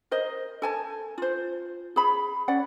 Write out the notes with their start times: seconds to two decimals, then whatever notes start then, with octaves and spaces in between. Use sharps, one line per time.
0.11 A#4 C5 D#5
0.62 A4 G#5 A5
1.18 F4 C5
1.96 G#4 B5
2.48 C#4 D5 F#5